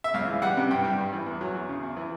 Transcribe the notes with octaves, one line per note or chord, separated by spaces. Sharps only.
E5
C#2 F5
E3
G3 F#5
C3
G2 G5
G3
G2
E3
E2
F#3
E2
C#3
E2
E3